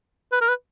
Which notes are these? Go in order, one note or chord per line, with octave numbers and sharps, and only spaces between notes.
B4
A#4
B4